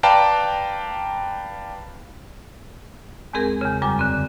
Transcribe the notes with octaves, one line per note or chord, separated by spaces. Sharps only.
B4 D5 F5 G5 A5 A#5
E2 G#3 C4 G#4 A#4
E2 C#3
F#2 G3 G#5 D6
D3 C4